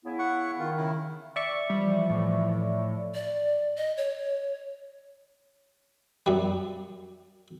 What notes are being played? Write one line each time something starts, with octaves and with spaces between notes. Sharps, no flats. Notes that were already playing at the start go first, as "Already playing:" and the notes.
C#3 B3 E4
F#5 C#6
D#3 F4
C#3 E4
D5 E5 C#6
E3 F3 G3
A2
D5
D#5
C#5
F#2 G3